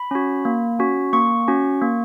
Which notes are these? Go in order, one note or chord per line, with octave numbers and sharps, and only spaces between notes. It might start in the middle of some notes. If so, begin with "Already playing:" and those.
Already playing: B5
C#4 F#4
A#3
C#4 F#4
A#3 C#6
C#4 F#4
A#3